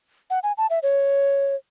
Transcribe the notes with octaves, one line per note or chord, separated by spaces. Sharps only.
F#5
G#5
A5
E5
C#5